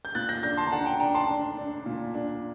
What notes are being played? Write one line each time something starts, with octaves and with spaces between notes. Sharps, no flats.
G6
A#2 F#6 A6
G6 A#6
D4 G6 A#6
A5 C6
A#5
D4 F#5 A5
G5 A#5
D4 G5 A#5
A5 C6
D4
D4
A#2
D4